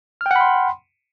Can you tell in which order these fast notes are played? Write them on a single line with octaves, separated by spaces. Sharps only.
F6 G5 F#5 B5 C6